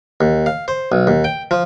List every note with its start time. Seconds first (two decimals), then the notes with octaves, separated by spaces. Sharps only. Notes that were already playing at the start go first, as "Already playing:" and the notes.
0.21 D#2
0.46 F5
0.68 C5
0.92 B1
1.07 D#2
1.24 G5
1.51 F3